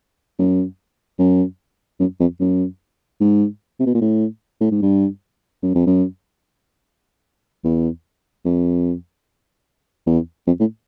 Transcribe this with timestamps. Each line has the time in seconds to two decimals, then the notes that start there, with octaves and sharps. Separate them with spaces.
0.39 F#2
1.19 F#2
2.00 F#2
2.20 F2
2.40 F#2
3.21 G#2
3.80 C3
3.86 B2
3.94 A#2
4.01 A2
4.61 A2
4.71 G#2
4.82 G2
5.63 F#2
5.75 F2
5.86 F#2
7.64 E2
8.45 F2
10.07 E2
10.47 F2
10.60 A2